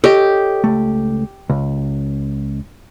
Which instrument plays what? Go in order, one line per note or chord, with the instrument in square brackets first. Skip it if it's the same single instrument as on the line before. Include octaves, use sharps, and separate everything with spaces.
[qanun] G4 [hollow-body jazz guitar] A4 C#5 D#5
[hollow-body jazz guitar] C#2 A3
C#2